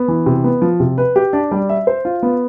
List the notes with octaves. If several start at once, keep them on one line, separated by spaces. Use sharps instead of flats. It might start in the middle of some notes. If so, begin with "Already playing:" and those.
Already playing: B3
E3
C3
B3
F3
C3
B4
G4
D4
G3
E5
C5
F4
B3